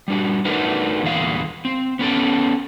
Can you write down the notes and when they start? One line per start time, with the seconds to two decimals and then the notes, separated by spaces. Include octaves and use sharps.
0.08 G3 D4 F#4
0.45 A3 D4 D#4 F#4 A#4 B4
1.03 E2 A#2 D3 G#3 F5
1.65 C4
1.99 B3 C#4 A4 G5